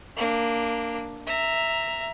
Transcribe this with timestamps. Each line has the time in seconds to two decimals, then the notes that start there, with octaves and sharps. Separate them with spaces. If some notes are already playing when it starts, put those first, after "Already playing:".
0.17 A#3 D4
1.26 E5 A#5